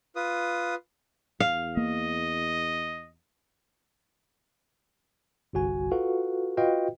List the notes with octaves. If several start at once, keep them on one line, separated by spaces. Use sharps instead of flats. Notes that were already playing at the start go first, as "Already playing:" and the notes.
F4 B4 D#6
E2 F5
A#3 D#5
G1 C2 F#4 G#5
F4 F#4 A4 B4 F5 F#5
F4 F#4 B4 D#5 F5 G5